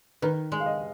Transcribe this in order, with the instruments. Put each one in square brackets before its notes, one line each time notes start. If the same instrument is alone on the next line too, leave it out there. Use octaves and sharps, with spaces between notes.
[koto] D#3 [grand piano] B4
[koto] G#3
[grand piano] F5
D#5